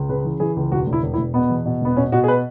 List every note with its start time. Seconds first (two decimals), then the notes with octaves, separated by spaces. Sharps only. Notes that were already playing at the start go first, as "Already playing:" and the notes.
Already playing: C#2
0.09 C#3 B4
0.24 E3
0.40 E3 G#4
0.56 C#2
0.72 E1 F#4
0.87 E1
0.93 E4
1.03 E1
1.14 E4
1.18 E1
1.34 B2 B3
1.50 E2
1.65 B2
1.81 E1 B3
1.96 B2 C#4
2.12 B2 F#4
2.24 G#4
2.28 B4